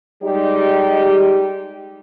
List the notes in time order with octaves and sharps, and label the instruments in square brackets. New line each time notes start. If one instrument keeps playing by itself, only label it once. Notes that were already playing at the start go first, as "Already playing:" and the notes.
[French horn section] G3 G#3 D#4 G4